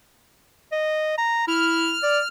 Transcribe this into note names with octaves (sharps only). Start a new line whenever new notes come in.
D#5
A#5
E4 F6
D5